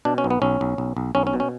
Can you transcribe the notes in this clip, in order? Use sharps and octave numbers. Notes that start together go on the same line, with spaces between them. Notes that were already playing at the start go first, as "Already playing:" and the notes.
B2 D4
C#4
B1
B3
B1 C#4
B1
B1
B1
B1 C#4
C#4
B2
C#4